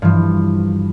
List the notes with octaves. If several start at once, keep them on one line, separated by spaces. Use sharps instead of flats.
G2 E3 F3